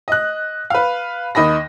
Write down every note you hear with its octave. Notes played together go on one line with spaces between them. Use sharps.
D#5 F#6
B4 F5
D#2 D#5 B5 A#6